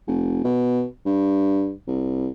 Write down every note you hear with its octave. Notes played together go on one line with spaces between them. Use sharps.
F1
B2
G2
C2